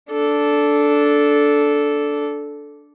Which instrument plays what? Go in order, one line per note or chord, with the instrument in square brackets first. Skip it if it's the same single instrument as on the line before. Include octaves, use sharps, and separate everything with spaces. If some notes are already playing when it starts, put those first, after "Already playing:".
[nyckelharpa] D4 A4